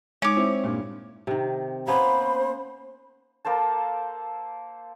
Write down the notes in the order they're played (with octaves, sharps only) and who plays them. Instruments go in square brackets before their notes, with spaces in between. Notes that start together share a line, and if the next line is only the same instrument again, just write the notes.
[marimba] G#3 D#4 [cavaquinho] C#5 D6
[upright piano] C4 E4
G2 A#2
[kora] C3 D#3
[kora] A#3 B3 C#4 [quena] C5 [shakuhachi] B5
[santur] A#3 A4 C5 A5